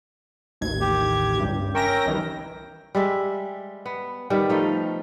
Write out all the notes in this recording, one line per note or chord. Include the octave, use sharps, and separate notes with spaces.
A1 D#2 G#6
G4
G1 C#2 G2
C#4 A#4 E5 G5 A#6
C2 D#3 E3
G3 G#3 E5
B3
D#3 G3 B3
F3 A3 D#4